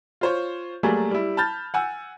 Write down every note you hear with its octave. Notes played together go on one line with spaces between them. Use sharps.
F4 C5 C#5
F#3 G3 A3 A#3 G#4
G3 E4
A5 B5 F6 G6 A6
F#5 G#5 E6